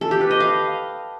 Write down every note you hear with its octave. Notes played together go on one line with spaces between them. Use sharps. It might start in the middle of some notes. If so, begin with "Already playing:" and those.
A4
G4
B4
D#5
F5